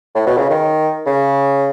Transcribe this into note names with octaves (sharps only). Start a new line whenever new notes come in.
A2
B2
C#3
D#3
C#3